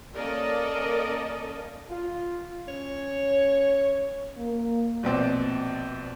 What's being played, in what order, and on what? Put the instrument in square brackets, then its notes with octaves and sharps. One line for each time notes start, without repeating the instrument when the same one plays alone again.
[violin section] A#3 C#4 A4 [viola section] A#4 D5 D#5
[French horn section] F4
[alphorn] C#4 [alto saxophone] C#5
[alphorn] A#3
[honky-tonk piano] A#1 B2 C4 D5